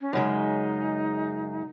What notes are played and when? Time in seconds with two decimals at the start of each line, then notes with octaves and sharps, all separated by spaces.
0.01 C#4
0.13 F#2 C#3 G#3 D#4